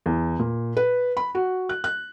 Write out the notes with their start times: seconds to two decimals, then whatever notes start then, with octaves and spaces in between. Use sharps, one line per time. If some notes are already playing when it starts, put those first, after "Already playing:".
0.06 E2
0.39 A#2
0.77 B4
1.17 B5
1.35 F#4
1.69 F#6
1.84 F#6